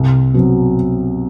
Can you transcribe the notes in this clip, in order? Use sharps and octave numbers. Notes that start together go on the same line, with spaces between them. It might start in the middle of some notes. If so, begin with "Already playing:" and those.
Already playing: C2
B2 F#3 C4